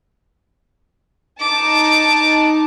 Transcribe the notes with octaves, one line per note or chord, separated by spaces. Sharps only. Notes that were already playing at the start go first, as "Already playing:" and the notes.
D#4 A5 D6